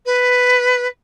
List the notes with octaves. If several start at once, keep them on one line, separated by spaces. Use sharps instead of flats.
B4